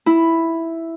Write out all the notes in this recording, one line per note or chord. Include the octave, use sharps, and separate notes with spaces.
E4